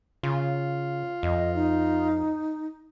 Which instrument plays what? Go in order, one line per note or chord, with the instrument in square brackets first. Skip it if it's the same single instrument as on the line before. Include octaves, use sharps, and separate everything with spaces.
[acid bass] C#3 [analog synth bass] F4
[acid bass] F2 [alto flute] D#5
[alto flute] D#4